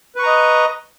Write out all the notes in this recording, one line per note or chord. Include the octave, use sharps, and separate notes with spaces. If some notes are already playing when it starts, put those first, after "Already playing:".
B4 D#5 A#5 C#6